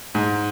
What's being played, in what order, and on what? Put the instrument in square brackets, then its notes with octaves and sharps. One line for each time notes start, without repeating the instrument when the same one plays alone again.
[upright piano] G#2